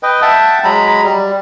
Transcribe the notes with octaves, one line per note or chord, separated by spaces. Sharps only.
B4 D#5 G5
E5 F#5 G5 A5
F#3 G#3 A#5 B5
G3